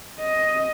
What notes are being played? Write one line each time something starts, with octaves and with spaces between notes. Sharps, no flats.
D#5